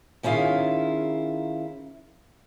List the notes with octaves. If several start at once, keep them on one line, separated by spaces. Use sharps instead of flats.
D#3 C#4 E4 F4 G#4 F5